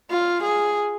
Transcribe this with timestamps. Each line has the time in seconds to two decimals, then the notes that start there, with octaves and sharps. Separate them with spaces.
0.11 F4
0.43 G#4